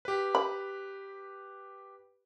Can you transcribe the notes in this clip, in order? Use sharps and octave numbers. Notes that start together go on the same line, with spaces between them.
G4 B4
B5